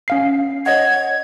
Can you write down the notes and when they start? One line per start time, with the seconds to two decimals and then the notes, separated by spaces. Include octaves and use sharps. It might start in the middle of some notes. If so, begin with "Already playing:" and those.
0.08 C#4 F5 C7
0.66 C#5 D#5 F#5 G#6